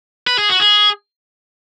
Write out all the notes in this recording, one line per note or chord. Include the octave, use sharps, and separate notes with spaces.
B4
G#4
F#4
G#4